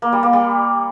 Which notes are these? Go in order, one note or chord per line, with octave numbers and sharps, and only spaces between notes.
A#3
G3
A#3
G3